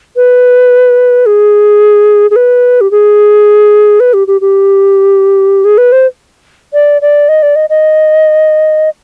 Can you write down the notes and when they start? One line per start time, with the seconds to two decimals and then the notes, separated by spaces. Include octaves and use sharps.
0.16 B4
1.26 G#4
2.30 G#4
2.36 B4
2.81 G4
2.91 G#4
4.00 B4
4.13 G4
4.27 G4
4.41 G4
5.64 G#4
5.78 B4
5.92 C5
6.73 D5
7.02 D5
7.29 D#5
7.42 D5
7.56 D#5
7.69 D#5